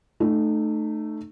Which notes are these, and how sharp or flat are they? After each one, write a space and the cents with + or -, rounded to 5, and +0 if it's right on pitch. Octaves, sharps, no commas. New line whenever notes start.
A3 +0 D#4 -30